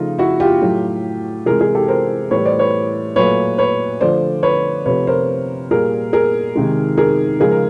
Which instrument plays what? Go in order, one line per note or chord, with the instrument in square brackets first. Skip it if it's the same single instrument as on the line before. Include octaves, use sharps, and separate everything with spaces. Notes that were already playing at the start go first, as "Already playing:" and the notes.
Already playing: [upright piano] C#3 F3 A3 D#4 F4
E4 F#4
F4 G4
A2 F#3 A3
C3 E3 G#3 G#4 A#4
G#4 A#4
G4 A4
A#4 C5
A2 E3 G3 B4 C#5
C5 D5
B4 C#5
A#2 F#3 A3 B4 C#5
B4 C#5
D3 F3 A3 C5 D5
B4 C#5
C3 F3 A3 B4 C#5
A#4 C5
A#2 G3 G#4 A#4
G#4 A#4
C3 D#3 G#3
G#4 A#4
C#3 F3 G#3 G#4 A#4
A#4